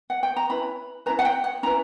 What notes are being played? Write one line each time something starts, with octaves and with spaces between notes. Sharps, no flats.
F#5
G5
A#5
C#4 E4 B4 B5
C#4 E4 B4 A#5
F#5
G5
F#5
C#4 E4 B4 A#5